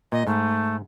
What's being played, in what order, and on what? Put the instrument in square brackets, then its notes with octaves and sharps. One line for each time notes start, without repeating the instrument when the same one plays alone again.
[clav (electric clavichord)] A#2 [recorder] D#5
[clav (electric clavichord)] G#2 [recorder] A3